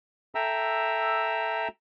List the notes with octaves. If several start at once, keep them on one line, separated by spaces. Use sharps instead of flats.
A4 E5 G5 A#5 E6